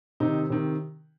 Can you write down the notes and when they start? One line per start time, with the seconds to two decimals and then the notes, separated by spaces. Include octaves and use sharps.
0.20 C3 D#3 D#4
0.50 C3 D#3